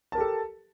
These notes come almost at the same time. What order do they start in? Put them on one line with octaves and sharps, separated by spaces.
A5 A#4 G4 A4